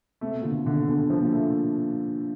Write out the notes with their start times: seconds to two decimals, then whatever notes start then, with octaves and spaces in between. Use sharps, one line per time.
0.21 C3 A3
0.31 B2
0.41 A#2 D3
0.51 B2
0.66 D3
0.88 B2 D3
1.10 F3
1.22 A#2
1.32 A3